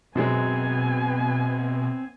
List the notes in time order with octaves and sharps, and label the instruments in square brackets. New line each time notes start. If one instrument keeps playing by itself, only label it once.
[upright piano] F#2 F#3 G#3 [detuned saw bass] B2 [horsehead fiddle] B3 G#5 [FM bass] C4